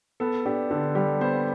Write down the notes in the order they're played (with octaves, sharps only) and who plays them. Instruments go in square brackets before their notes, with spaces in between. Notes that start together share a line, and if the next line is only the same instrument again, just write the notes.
[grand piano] B3 A4
D4 G4
D3 A4
G3 G4
B3 C5